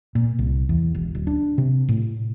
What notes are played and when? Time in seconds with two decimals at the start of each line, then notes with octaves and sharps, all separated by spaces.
0.15 A#2
0.39 C2
0.69 E2
0.95 E1
1.15 D1
1.27 D4
1.58 C3
1.89 A2